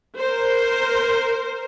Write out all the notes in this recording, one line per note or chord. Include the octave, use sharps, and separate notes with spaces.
A#4 C5